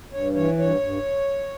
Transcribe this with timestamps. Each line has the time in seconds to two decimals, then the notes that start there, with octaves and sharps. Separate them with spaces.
0.12 G2 C#5
0.35 E3 C#5
0.58 G2 C#5
0.81 G2